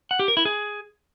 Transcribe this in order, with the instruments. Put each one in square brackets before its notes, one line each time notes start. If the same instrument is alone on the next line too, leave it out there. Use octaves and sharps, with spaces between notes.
[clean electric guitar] F#5
G4
A#4
E4
G#4